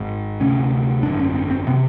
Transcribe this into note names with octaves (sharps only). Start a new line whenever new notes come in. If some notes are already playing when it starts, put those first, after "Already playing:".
Already playing: G#1 G#2
D2 C3 C#4
G#1 F#2 D3 D4
C#4
C4
C4
C3 B3